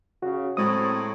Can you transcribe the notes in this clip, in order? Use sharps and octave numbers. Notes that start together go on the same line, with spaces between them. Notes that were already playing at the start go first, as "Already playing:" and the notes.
C#3 F#4
A2 F#3 G#3 C4 D#6